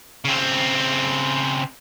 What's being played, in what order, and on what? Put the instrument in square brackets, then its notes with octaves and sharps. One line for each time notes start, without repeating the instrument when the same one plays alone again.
[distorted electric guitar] C#3 C4